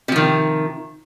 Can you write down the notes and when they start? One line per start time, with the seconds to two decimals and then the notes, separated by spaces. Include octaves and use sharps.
0.08 C3
0.12 F3
0.16 D#3